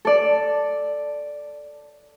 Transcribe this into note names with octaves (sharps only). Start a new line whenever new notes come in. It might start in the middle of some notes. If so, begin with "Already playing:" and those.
A4 D5